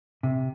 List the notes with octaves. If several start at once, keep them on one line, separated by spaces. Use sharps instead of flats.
C3